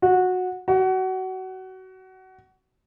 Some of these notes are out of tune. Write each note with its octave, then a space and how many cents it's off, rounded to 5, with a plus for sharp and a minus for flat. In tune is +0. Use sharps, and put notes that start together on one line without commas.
F#4 -15
F#4 +25